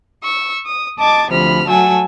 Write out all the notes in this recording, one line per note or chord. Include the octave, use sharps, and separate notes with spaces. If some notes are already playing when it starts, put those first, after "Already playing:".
C#6 E6
D#6
D#5 A5 D6 G#6 A6
D2 C3 F3 B5 F6
F#3 A3 F#4 G#5 A5 E6